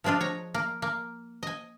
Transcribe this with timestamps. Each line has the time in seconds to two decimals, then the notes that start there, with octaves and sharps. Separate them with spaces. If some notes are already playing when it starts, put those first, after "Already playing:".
0.04 F3 G#3 C4 D4 F4
0.21 C#5 A#5
0.54 A#3
0.82 A#3
1.43 D#5 G#5